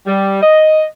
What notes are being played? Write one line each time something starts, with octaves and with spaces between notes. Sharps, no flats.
G3
D#5